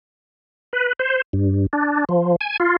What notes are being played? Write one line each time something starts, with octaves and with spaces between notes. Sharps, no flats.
B4
C5
G2
D4
F3
G#5
F4